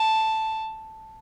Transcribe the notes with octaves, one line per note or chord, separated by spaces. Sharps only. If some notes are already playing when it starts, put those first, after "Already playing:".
Already playing: A5